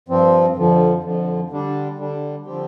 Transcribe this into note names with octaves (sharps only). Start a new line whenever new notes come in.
G2 F3 C4
F2 D3 F3
F2 D3 F3
D3 G3 D4
D3 G3 D4
D3 F3 C4 G4